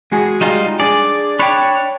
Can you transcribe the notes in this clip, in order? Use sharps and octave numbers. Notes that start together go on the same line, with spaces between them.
G#3 F#4 G#4
G3 D#4 F4
D4 G#4 D5
D4 C#5 G5 B5